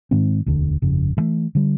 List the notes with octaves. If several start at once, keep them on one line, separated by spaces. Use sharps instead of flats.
G#2 D#3 G#3 C4
E1 D2 D3
G1 F2 C#3
G2 E3 A3
D3 G3